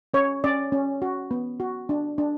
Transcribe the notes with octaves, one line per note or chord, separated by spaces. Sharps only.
C#4 C#5
C#4 D5
C#4
F#4
B3
F#4
D4
D4